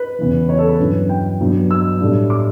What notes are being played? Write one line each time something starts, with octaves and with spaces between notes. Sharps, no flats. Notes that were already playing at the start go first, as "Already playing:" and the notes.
Already playing: B4
E2 C#3 E3
C#5
A4
B4
G2 F#3 C#4 E4
G5
G2 F#3 B3
E6
A2 G3 D4
D6